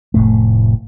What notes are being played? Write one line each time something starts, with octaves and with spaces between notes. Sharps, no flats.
F1 A2 A3